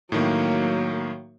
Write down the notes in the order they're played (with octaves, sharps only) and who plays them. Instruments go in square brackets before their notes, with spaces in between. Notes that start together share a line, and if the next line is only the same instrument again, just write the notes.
[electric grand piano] A2 D#3 [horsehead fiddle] F#3 A#3